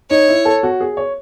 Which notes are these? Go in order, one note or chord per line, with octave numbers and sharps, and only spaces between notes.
D#4 C#5
E4
A4
F#4
G#4
C#5